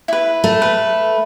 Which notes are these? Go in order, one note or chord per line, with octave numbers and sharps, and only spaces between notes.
E4 B4
A3
B4